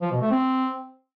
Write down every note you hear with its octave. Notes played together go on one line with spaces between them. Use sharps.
F3
B2
A3
C4